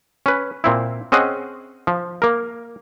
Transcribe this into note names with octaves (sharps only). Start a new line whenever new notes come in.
C#4 B4
A#2 C4 E4
C4 C#4 G#4 D#5 F#5
F3
A#3 A#4